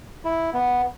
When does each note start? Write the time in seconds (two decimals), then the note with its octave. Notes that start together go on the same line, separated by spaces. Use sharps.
0.24 E4
0.53 B3